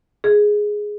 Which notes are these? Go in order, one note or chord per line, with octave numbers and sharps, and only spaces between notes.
G#4